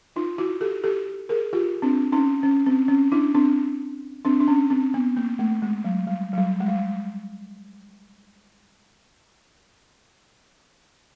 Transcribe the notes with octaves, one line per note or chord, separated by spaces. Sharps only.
D#4 F4
E4 F#4
G4 A4
G4 A4
G#4 A#4
F4 G4
C4 D4
C#4 D#4
C#4
C4
C#4
D4 E4
C4 D4
C4 D4
D4
C#4
C4
B3
A#3
A3
G#3
F#3
G3
F#3
G3
G#3
G3